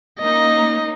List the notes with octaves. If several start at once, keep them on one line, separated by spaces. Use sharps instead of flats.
A#3 C#4 D#4 D#5